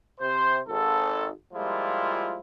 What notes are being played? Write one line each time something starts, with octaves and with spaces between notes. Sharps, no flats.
C3 C5
G#1 A4
F3 G3 G#3 A#3 E4 F4